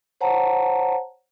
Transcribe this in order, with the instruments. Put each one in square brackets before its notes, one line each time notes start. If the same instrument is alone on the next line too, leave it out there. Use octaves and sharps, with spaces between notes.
[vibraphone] C5 C#5 F#5 A5 A#5